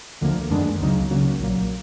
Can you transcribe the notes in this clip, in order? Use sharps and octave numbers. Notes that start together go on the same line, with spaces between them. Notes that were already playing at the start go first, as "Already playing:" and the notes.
D2 D3 F3 A#3
F#2 D#3 G#3 B3 D4
C#2 C#3 F#3 A#3 D#4
C#3 F#3 A#3 C#4 F#4
B1 A#2 F#3 A#3